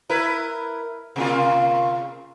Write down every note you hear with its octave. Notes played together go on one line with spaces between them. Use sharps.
E4 A#4 B4
C3 A#3 F4